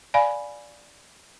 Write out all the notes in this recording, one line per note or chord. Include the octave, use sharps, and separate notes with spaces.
D5 F5 G#5 B5